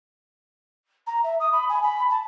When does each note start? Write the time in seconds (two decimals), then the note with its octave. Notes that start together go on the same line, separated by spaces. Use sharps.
1.06 A#5
1.23 E5
1.39 D#6
1.52 B5
1.69 G#5
1.82 B5
2.09 A5